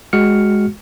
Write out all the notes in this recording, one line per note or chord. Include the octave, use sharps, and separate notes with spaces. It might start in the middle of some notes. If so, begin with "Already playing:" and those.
G#3 F#4 F6 C#7